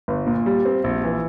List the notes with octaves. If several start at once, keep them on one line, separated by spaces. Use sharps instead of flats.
G1
A#2
G3
C4
A#1
E3